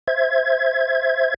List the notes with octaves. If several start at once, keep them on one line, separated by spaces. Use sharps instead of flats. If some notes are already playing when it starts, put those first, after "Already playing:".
C5 E5 G#6